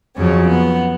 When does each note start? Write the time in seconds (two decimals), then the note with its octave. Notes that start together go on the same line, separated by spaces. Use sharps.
0.16 F2 C#3 F#3 C#4
0.50 B3